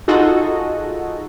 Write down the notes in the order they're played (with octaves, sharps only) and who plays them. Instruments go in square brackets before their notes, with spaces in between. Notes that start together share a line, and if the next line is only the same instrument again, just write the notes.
[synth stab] D#4 F4 F#4 G#4 A4 D#5